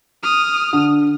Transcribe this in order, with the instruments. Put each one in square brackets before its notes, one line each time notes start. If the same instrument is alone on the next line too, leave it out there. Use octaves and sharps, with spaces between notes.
[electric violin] D#6 F6
[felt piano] D3